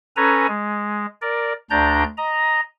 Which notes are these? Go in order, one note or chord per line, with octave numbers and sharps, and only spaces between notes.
C#4 A4 B4 G#5 A#5
G#3
A#4 D5
D2 D4 D5 A#5 G6
D#5 A#5